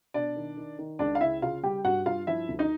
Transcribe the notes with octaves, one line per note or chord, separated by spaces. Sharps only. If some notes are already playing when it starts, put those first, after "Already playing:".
B2 D4 D5
D#3
D#3
D#3
C#2 D4 D5
F5
C#3 E4 E5
C#3 F4 F5
G3 G4 G5
G2 F#4 F#5
G2 F4 F5
F3 E4 E5
D2
D#4 D#5